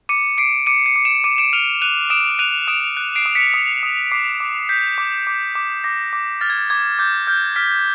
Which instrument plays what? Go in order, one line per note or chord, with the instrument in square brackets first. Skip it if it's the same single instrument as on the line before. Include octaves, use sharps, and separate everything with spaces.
[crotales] D6 C#7 D#7
D6 C7 D7
D6 C#7 D#7
C#7 D#7
D6
D7 E7
D6 C#7 D#7
D7 E7
F6 D#7 F7
F#6 D#7 F7
D#6 D7 E7
F#6 D#7 F7
D#6 D7 E7
F#6
C7 D7
D#6
B6 C#7
D#6
D#6
D6 C7
D6
G6 B6
D6
D6
D6
D6 A#6
D6
F6 A6
G#6
A6
D6 G#6
D6 G6
F6 G6
F6 B6